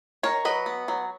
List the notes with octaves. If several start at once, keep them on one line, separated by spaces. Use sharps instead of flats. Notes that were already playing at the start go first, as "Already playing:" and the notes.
D#3 A#4 C#5
F#3 B4 D#5
B3
F#3